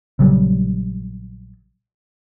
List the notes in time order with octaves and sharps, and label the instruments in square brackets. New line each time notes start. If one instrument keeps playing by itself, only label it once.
[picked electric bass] A#1 C#3 F#3 G3